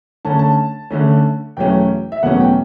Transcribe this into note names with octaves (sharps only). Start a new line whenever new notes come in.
D3 A3 C#4 A5
A5
D3 A3 C#4
E2 B2 F#3 A3 C#4 G5
E5
E2 B2 F#3 A3 C#4 F#5
G5